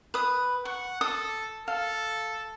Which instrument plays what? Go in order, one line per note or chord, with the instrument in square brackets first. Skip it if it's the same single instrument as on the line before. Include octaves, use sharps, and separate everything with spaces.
[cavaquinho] B4 D#6
[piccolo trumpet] F#5 [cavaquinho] C#6
[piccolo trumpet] A4 [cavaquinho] D#6
[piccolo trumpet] A4 [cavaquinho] F5